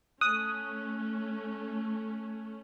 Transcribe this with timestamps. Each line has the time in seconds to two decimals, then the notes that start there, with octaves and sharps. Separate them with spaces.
0.21 A3 C#4 D#6 F#6